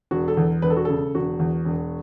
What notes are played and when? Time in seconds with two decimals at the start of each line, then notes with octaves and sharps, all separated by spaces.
0.11 E1 F#4
0.28 A4
0.37 E2
0.62 E1 B4
0.70 A4
0.77 F#4
0.85 C#3 A4
1.15 E1 F#4
1.40 E2
1.65 E1